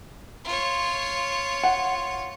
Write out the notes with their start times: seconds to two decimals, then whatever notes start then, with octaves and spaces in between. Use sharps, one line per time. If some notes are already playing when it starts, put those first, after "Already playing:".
0.45 F4 C#5
1.64 F#5